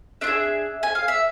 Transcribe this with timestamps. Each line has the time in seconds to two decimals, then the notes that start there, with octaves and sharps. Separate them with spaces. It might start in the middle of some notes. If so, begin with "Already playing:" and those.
0.21 D4 F4 E5
0.27 G#4
0.83 G#5
0.95 F5
1.08 E5